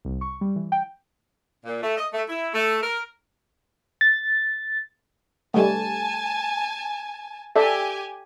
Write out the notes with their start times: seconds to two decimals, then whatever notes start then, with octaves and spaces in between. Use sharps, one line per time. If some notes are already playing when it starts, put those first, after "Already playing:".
0.05 C2
0.21 C#6
0.41 G3
0.56 E3
0.72 G5
1.65 A#2
1.83 A3
1.97 D#5
2.13 A3
2.29 E4
2.54 A3
2.83 A#4
4.01 A6
5.54 G3 A3 G#5 A5
7.56 G4 A4 D5 E5 G#5